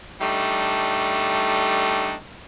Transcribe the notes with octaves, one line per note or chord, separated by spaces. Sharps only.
G3 A3 D4 D#4